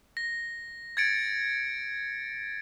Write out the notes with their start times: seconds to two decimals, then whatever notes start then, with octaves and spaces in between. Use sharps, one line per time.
0.17 A#6
0.97 G#6 A6 C#7 D7